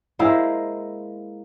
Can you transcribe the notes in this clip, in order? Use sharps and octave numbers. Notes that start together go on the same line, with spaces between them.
G#3 A#3 E4 C5